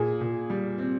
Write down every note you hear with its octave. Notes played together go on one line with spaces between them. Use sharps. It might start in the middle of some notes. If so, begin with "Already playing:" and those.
Already playing: A#2 G#4
A#2
G3
C4